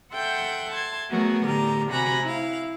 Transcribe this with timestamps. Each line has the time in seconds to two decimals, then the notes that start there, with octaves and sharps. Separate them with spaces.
0.13 A4 E5 F#5 G5 C6 G6
0.72 A5 C6 G#6
1.10 F#3 A3 B3 F#4 G#4 A#4
1.45 A2 D3 G4 A#4 A#5
1.90 C3 F#4 G#5 A#5 B5 F#6
2.22 E4 F5